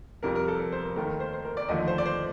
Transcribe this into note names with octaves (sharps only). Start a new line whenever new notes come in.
F2 C3 G3 A#4
A#4
A4
A#4
C5
A#4
D#2 D#3 A3 A#4
A#4
C5
C5
A#4
D5
D#2 D3 F3 A3 D#5
C5
D5
C5